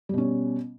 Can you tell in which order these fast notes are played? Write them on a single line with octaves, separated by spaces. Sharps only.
G3 B2 C#4